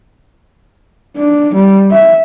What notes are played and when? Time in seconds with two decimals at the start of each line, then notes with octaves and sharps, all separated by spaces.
1.16 D4
1.55 G3
1.91 E5